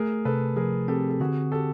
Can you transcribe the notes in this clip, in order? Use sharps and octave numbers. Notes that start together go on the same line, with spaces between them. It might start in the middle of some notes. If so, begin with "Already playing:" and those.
Already playing: A3 G#4 A#4
C3 A4 B4
F3 G#4 A#4
C4 G4 A4
A4
D3 F#4 G#4
G4 A4